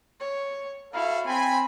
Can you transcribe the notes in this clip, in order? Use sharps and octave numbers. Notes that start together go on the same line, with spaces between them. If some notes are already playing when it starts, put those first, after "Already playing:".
C#5
E4 F#4 A4 F5
C4 G#5 B5